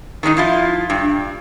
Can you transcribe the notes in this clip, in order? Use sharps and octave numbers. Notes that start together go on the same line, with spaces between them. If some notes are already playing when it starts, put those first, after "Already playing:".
D#3 G#3 C#4 D#4
F3 E4 F4
G2